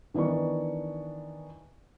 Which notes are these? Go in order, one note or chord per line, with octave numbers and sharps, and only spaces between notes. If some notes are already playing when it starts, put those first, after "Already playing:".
D#3 E3 B3 D4 C#6